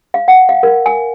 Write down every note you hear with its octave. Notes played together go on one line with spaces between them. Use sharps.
F5
F#5
F5
A#4
G#5